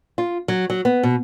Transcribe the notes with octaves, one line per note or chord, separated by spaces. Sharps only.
F4
F#3
F#3
B3
B2